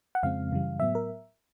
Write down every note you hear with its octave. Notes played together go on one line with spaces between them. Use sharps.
F#5
F2 C#3 F3 G#3 C4 F5
F#2 C#3 E3 G3
A2 F#3 B3 E5
A#4